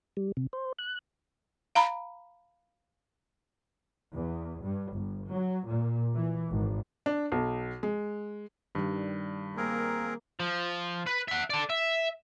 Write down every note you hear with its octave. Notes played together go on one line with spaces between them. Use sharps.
G3
C3
C5
F#6
F5 A#5 B5
E2
G2
G1
F#3
A#2
E3
G#1
D4
B1
G#3
G2 D#3 G3
A#3 C4 G#4 A#4
F3
B4
E5 F#5
A4 D5
E5